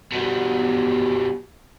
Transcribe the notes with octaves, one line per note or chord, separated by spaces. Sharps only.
B2 G3